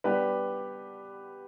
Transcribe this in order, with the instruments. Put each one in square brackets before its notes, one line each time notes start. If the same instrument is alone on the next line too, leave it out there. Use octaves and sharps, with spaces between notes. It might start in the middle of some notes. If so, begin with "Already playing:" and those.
[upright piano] G3 B3 D4 G4 B4